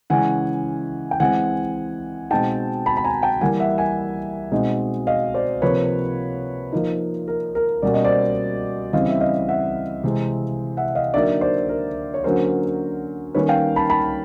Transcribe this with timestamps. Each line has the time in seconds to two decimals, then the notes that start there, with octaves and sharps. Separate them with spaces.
0.10 C#3 E3 G#3 C#4 F#5 G#5
1.11 G5
1.20 E3 G#3 C4 F#5 G#5
2.30 B2 G#3 C4 D#4 G5 A5
2.86 A5 B5
2.97 B5
3.04 G#5 A#5
3.22 G5 A5
3.41 E3 G3 A#3 F#5 G#5
3.60 E5 F#5
3.78 F#5 G#5
4.51 B2 G#3 C4 D#4
5.07 D#5 F5
5.34 C5 D5
5.62 C3 F3 A#3 B4 C#5
6.72 F3 A#3 D#4
7.28 A#4
7.55 A#4
7.82 B2 G3 A#3 C#4 D5
7.94 D#5
8.05 C5 D5
8.93 C#3 E3 G3 C4 D#5 F5
9.09 E5
9.20 D#5 F5
9.48 E5 F#5
10.04 C3 E3 G#3 C4
10.77 E5 F#5
10.95 D#5 F5
11.14 D3 F#3 A#3 D#4 D5 E5
11.41 C5 D5
11.69 A#4
12.14 C#5
12.24 D3 F#3 A#3 C#4 A#4 C5
13.34 D#3 G3 A#3 C#4 B4 C#5
13.49 F5 G5
13.76 A5 B5
13.89 A5 B5